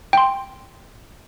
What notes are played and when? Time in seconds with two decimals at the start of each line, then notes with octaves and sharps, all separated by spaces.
0.13 G5 C6